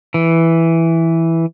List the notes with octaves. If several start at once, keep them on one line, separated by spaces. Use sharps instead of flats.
E3